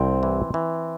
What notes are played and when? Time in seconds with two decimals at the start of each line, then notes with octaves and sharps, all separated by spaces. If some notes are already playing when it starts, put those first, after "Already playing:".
Already playing: C2 C4
0.23 E3
0.54 E3